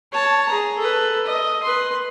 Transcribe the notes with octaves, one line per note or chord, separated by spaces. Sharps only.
C#5 A5
G#4 A#5
A4 B4
D#5
B4 C6